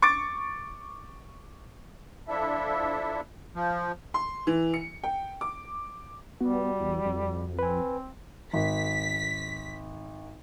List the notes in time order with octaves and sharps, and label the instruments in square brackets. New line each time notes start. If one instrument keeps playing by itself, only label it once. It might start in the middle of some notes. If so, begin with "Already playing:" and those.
[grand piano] C#6 D6 A6 D7
[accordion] F3 D4 E4 A4 E5
F3
[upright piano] C6
E3
C#7
G5
D6
[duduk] G3 [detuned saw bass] B3 [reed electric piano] F#4
[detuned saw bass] E2
F2
[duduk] C4 [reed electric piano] B4 G#5
[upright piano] G#1 [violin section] B6